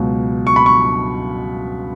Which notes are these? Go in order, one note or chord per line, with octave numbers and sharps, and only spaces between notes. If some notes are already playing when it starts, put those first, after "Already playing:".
Already playing: C#2 B2 F#3
C#6
B5
C#6